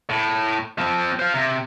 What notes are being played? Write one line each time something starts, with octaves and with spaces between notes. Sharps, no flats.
A2
F3 C4
C5 F5
C3